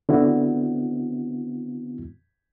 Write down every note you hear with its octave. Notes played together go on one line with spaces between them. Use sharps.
D3 B3 C4 E4 F#4